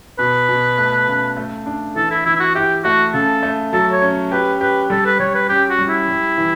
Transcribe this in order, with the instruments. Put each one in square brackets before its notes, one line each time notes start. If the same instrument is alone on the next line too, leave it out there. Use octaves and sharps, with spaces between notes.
[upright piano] B2 [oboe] B4
[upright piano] B2
A3
C#3
A3
D4
[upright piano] E3 [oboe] A4
[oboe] E4
[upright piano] E3 [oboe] E4
[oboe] E4
F#4
[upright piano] E4 [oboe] G4
[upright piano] A3 [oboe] F#4
[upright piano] C#3 [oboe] A4
[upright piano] A3
[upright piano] F#3 [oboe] A4
[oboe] C#5
[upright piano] C#4
[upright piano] G4 [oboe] B4
[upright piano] G4 [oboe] B4
[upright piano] G3 [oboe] A4
[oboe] B4
[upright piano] G3 [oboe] C#5
[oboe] B4
[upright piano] C#4 [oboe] G4
[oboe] F#4
[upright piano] G3
[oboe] E4
[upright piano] G3
E3